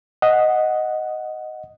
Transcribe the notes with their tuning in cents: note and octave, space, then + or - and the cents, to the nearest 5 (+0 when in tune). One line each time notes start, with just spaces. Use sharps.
D#5 +0 F#5 +0